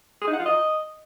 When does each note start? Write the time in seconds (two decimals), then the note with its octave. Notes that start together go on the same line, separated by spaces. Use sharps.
0.21 G#4
0.27 D#4
0.33 F#5
0.40 F4
0.46 D#5